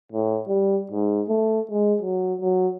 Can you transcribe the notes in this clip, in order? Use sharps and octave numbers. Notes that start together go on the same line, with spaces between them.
A2
G3
G#2
A3
G#3
F#3
F#3